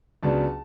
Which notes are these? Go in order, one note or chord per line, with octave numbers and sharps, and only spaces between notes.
C#2 C#3 F#3 B3 D4 A5